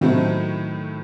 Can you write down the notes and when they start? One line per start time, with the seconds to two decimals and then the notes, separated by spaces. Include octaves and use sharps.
0.01 A2 D#3 F#3 A3 C4